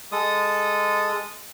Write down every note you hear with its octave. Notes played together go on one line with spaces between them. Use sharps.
G#3 A4 D#6